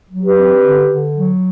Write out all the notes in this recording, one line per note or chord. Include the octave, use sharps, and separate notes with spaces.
F#3
G4 B4
C4
D3
D3
F#3